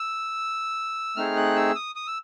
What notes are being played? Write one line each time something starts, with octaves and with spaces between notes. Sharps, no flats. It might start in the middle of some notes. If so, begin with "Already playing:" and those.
Already playing: E6
A3 C4 D#4 G#4 F6
F#6
E6
D#6
D#6
E6